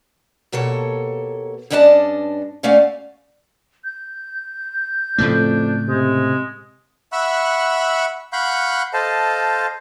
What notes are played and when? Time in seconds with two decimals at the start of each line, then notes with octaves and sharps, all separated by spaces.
0.52 D#2 B2 A#3 A4 C#5
1.70 G2 C#4 D4 D5 D#5 A5
2.63 D2 A3 C#4 D5 F5 G#5
3.84 G6
5.18 F2 A2 C#3 A3 D4
5.88 C3 G#3
7.12 E5 F#5 B5 C#6 E6 F#6
8.33 F5 F#5 B5 C#6 F#6 G6
8.93 A4 C5 D#5 F5 A5